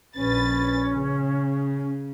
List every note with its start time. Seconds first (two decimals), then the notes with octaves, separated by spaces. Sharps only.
0.15 A#1 C#4 B4 A6
0.92 C#3